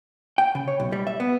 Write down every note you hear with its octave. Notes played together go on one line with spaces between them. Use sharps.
G5
C#3
C#5
B1
G3
E5
B3